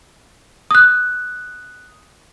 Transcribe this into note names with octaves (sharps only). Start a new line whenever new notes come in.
D#6 F#6